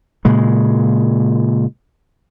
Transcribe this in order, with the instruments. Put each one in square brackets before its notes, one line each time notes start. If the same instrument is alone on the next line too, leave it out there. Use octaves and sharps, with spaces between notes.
[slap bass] A#2 C#3 G#3